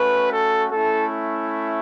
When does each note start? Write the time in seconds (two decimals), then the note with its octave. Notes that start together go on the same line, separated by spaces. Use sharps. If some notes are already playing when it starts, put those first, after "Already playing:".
Already playing: A3 C#4 F#4 B4
0.31 A4
0.72 A3 C#4 E4 A4